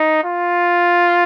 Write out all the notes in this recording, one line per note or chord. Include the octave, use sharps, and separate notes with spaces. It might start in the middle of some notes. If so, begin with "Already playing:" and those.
Already playing: D#4
F4